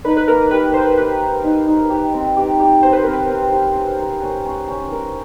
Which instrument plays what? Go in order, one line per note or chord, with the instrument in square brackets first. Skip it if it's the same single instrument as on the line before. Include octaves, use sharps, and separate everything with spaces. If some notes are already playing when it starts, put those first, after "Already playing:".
[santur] D#4 [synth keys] B4
[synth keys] B4
[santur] A#3 [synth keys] A#4
[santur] G4 [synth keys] B4
[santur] A#3 [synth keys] C5
[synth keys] B4
C5
[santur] G4 [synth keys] B4
[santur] A#3
D#4
D#4
G4
C4
G4
G4
[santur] C4 [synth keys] C5
[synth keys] B4
[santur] C4 [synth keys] A#4
[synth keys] B4
[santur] C4
G4
C#4
A#4
C#4
C#4
C#4
A#4